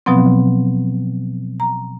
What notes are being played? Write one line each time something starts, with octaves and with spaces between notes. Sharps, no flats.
B2 F3 F#3 B3 C4
A#5